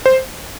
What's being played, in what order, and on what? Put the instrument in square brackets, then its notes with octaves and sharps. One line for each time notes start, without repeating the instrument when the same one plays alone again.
[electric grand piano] C5